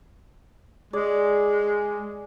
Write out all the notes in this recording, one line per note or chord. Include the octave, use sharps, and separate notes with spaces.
G#3 G#4 D5